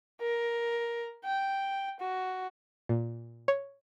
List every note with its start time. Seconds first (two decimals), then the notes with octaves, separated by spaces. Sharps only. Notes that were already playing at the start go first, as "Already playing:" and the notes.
0.21 A#4
1.24 G5
2.00 F#4
2.89 A#2
3.48 C#5